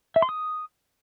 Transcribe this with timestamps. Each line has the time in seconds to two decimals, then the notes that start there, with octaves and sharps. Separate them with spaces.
0.16 E5
0.22 C6
0.29 D#6